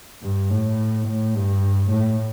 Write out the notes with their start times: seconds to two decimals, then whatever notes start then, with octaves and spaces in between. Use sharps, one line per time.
0.23 G2
0.51 A2
1.07 A2
1.35 G2
1.91 A2